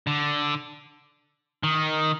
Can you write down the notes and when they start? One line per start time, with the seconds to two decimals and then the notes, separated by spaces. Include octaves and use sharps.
0.07 D3
1.63 D#3